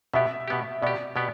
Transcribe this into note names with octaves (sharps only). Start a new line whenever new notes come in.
B2 B3 G4 E5
B2 B3 G4
B2 B3 G4 D5
B2 B3 G4